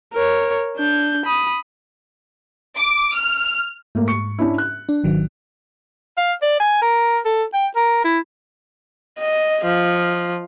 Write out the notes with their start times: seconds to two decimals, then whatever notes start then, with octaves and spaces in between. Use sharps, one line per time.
0.13 A#4 C#5
0.77 D4 G6
1.26 B5 D#6
2.78 D6
3.14 F6
3.95 G#2 A3 A#3
4.08 C#6 C#7
4.39 C#4 D4 E4
4.58 F#6
4.89 D4
5.04 G#1 D#3 F#3
6.18 F5
6.42 D5
6.60 G#5
6.82 A#4
7.25 A4
7.54 G5
7.76 A#4
8.05 E4
9.19 D#5
9.64 F3